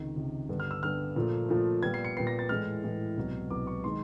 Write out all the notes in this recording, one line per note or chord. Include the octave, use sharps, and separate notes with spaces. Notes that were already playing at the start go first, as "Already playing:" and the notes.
Already playing: C#2 C3 D#3
C#2 C3 D#3
G2 D3 G3 B3
F6
E6
G2 D3 G3 B3 F6
A#2 F3 A3
A#2 F3 A3
A#2 G3 B3 G#6
C7
C#7
A#2 G3 B3 C7
A#6
A6
A2 E3 G#3 F6
A2 E3 G#3
C2 B2 F#3 B3
C2 B2 F#3 B3 D6
C#6
D#3 G#3 C6